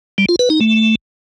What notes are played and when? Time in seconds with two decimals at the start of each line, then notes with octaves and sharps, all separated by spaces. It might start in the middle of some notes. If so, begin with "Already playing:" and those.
0.18 G3
0.29 F4
0.39 B4
0.50 D#4
0.61 A3